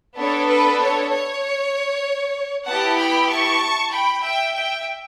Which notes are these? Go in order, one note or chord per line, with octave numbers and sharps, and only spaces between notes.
B3 D4 A4 C#5
B4
C#5
C#5
B3 E4 G4 F#5 A5
G5 B5
A5 C#6
G5 B5
E5 G5
E5 G5